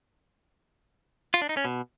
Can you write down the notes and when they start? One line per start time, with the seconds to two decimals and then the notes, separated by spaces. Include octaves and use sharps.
1.34 F4
1.42 D4
1.49 D#4
1.57 C#4
1.65 B2